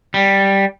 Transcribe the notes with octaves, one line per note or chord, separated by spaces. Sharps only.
G3